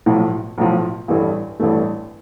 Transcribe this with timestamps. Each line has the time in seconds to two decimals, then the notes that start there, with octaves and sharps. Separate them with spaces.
0.06 B1 A2 F3
0.58 B1 A2 F3
1.08 A1 G2 E3 A3
1.60 A1 G2 E3 A3